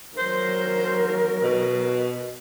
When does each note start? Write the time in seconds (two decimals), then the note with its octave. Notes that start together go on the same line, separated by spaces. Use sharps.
0.18 F#3 A#4 C5
1.43 B2